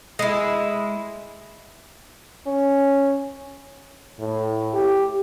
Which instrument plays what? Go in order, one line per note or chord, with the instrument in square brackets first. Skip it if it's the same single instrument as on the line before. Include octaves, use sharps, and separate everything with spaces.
[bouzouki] G#3 E4
[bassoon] C#4
[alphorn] A2
G4